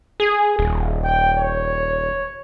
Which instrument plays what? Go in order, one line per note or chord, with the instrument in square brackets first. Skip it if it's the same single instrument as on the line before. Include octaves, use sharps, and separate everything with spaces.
[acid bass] G#4
D#1
[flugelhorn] G5
C#5